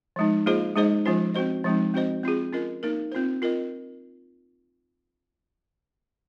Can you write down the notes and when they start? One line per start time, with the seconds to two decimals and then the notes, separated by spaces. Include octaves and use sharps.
0.16 F3 G#3 D#4
0.46 A#3 F4 G#4 C5 D#5
0.75 G#3 D#4 G#4 C5 D#5
1.06 F3 G#3 C#4 F4 C5
1.34 C4 F#4 C5 D#5
1.64 F3 G#3 C4 D#4
1.94 C4 F#4 C5 D#5
2.23 C4 F4 G#4
2.53 C#4 F4 A#4 D#5
2.83 A#3 D#4 A#4
3.12 C4 F4 C5
3.42 C4 F4 A#4 D#5